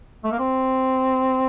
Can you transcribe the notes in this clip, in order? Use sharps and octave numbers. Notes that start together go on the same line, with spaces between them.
A3
A#3
C4